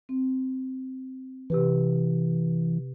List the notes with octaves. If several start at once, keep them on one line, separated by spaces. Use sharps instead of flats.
C4
C3 E3 G4 B4